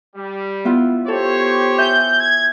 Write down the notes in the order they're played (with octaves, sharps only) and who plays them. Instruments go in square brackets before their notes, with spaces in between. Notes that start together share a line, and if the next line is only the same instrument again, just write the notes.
[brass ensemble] G3
[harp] B3 E4 F4
[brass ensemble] G4 C5 C#5 [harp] A4
[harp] E5 G#5 [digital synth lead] G6
[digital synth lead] G#6